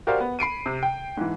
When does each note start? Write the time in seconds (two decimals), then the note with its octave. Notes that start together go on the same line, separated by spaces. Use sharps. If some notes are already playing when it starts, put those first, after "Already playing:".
0.07 F#4 G4 A#4 C5 D5 F5
0.20 B3
0.39 B5 C7 D7 D#7
0.66 C3
0.83 G5
1.17 G#2 E3